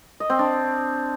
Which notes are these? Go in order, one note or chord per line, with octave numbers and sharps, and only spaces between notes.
D#5
C4
D4